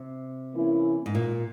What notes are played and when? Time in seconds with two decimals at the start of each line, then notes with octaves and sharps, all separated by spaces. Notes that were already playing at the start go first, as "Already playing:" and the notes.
Already playing: C3
0.54 E3 A#3 C#4 E4
1.06 G#2
1.15 A#2